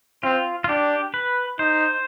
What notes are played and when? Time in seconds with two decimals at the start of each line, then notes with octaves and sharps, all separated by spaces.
0.23 C4 F4
0.64 F4
0.69 D4 G4
1.14 B4
1.59 D#4 C5